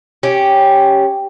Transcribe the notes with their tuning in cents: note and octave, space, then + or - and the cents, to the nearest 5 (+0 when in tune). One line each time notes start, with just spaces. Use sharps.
C#4 +0 G4 +0